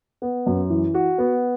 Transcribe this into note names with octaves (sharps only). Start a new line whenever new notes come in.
B3
F#2
E3
F#4
B3